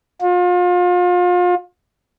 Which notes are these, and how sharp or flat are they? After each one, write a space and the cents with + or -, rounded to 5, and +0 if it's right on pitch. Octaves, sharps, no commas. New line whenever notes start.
F4 +35